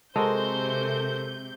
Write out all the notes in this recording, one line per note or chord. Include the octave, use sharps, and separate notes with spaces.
C3 G#3 F#4 A4 A#4 C5 G6